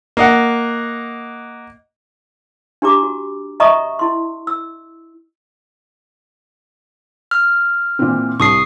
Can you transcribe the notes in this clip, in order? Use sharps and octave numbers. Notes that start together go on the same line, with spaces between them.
A#3 D#5 F#5
D4 G4 A#5 D6
F#4
D#5 E5 A#5 C#6 D#6
E4 C6
E6
F6
A#2 E3 C4
C2 C#6 D#6 C7